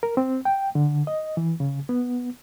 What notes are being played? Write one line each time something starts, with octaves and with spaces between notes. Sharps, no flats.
A#4
C4
G5
D3
D#5
E3
C#3
B3